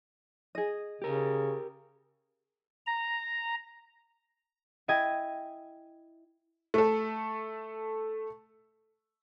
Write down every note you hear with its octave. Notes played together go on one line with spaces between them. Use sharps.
G#4 D#5
C#3 G4 A#4
A#5
E4 D#5 G5 G#5
A3 A4